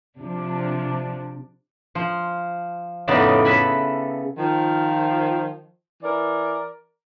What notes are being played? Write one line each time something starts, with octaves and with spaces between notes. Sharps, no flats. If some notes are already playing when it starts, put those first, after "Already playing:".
C3 F3 D4
F3
F2 A2 C#3 B3 D#4 D5
A4 B4 E5 G#5 B5
D#3 F3
E3 A#4 D5